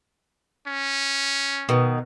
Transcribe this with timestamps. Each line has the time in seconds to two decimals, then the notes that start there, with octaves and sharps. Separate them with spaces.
0.67 C#4
1.69 B2 D#3